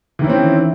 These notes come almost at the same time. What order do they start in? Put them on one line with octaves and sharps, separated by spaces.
E3 D#3 E4 C#4 C4